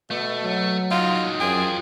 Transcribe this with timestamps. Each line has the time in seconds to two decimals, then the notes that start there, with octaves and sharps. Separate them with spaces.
0.11 B2 A3
0.44 F#3
0.91 D#4 F4 F#4
1.40 F#2 F4 G#4 G5